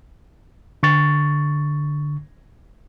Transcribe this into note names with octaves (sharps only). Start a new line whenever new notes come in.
D3 C#6 A6